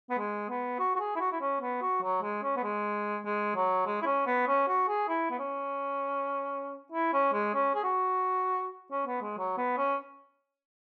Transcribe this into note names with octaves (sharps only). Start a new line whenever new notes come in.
B3
G#3
B3
F#4
F#4
G#4
E4
F#4
E4
C#4
B3
F#4
F#3
G#3
C#4
B3
G#3
G#3
F#3
G#3
E4
C#4
B3
C#4
F#4
G#4
E4
B3
C#4
E4
C#4
G#3
C#4
G#4
F#4
C#4
B3
G#3
F#3
B3
C#4